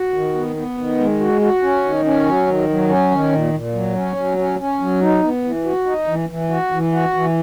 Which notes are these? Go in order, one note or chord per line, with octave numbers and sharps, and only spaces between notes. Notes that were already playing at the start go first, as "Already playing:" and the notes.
Already playing: F#4
D#3
B3
B3
D#3
G#3
F#4
F#4
C#4
D#3
C#4
F#3
D#3
F#3
C#4
D#3
A#2
A#2
F#3
C#4
F#3
C#4
C#4
F#3
D#4
B3
E3
F#4
D#4
E3
E3
F#4
E3
F#4
E3